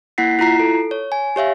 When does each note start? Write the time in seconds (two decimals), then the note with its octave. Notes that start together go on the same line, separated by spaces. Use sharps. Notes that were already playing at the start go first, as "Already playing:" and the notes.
0.18 A#3 E4 F#5 B6 C7
0.39 E4 F4 A#5 C7
0.59 A4
0.91 C#5
1.12 G#5
1.36 G4 C#5 E5 F5